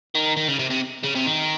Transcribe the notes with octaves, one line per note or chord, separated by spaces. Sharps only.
D#3
D#3
C#3
C3
C3
C#3
C3
D#3